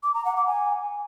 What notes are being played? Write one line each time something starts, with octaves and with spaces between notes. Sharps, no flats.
D6
A#5
F#5
D6
G#5